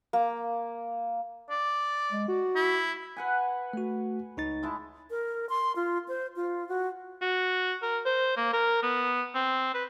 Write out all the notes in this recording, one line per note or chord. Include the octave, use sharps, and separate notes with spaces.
A#3
D5
G#3
F#4
E4
B4 F#5 G#5
A3 F#4
C#2 D#4 C#5 A6
G#3 E4 A5
A#4
C6
F4
C5
F4
F#4
F#4
A#4
C5
A#3
A#4
B3
C4
B4